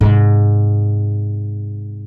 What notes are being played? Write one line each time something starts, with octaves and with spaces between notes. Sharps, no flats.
G#2 C3